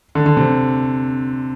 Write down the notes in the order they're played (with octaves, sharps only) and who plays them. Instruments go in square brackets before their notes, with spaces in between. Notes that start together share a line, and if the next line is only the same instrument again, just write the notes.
[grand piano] D3
D3
C3